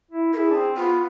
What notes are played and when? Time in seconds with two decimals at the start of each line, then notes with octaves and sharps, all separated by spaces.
0.11 E4
0.33 E4 G#4 A#4
0.50 D4
0.55 C4
0.76 B3 F4